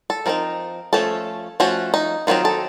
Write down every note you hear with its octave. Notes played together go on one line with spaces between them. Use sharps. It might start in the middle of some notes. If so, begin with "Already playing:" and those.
A4
F3 C4 D#4 A#4
F3 A3 C#4 A4
F3 A3 C#4 F#4
D#4
D#3 F#3 C4 D#4 F4
A4